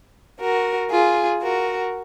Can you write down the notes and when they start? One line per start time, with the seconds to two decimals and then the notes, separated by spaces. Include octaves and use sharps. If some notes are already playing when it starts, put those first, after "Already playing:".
0.39 F#4 A#4
0.90 F4 G#4
1.41 F#4 A#4